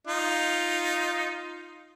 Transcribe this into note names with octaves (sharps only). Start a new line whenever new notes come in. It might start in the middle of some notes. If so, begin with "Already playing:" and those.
D#4 F4